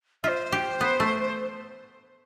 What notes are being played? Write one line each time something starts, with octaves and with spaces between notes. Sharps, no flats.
F4 C5 E5
G4
B3
A3